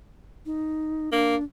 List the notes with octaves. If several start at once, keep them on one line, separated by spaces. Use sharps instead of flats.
D#4
A#3 D4